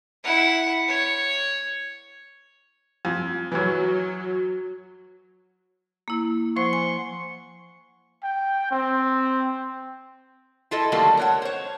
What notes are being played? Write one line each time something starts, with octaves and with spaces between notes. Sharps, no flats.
E4 F#5
C#5
F2
F#2 E3 F#3
A#3 E4
F3 C5 F#5 C6 C#6
G#5
G5
C4
E4 F4 A4 D#5
D3 D#3 F#3 G3 A3 A#3
A#4 C#5 F#5
C5 C#5